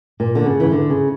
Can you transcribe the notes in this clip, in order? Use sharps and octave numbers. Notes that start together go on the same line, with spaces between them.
A#2
D3
C#3
E3
D3
C#3